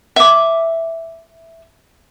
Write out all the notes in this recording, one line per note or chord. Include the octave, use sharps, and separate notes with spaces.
E5 D6